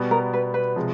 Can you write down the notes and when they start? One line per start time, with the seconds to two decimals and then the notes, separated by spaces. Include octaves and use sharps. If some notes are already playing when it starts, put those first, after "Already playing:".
Already playing: B2 G3 B3
0.11 A#4
0.33 B4
0.54 B4
0.76 C3 F3 G#3